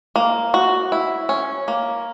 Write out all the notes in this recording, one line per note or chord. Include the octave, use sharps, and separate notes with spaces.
A#3
F#4
E4
C#4
A#3